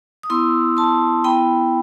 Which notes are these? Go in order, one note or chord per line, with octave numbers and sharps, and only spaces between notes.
D#6
B3 E4 C6 E6
A5 C6
B3 E4 G5 B5